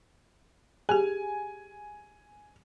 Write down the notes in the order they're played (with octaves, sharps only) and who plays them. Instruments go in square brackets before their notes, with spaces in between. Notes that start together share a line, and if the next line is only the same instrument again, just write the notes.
[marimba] G4 G#4 [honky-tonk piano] G#5